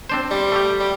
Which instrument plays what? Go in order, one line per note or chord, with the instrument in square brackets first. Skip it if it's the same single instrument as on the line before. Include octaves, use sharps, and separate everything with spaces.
[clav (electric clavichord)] C4 D4 C5
[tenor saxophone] G3
[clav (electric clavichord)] A3 G4
[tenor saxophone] G3